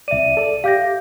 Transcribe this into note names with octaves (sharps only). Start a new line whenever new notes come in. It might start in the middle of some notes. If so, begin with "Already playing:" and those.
C2 D5 E5 D#7
A4 D5
G4 F5 D6 G6 A#6